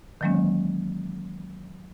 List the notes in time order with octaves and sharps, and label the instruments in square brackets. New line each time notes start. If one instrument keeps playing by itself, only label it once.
[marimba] D#3 E3 F#3 G#3 A#3 C#4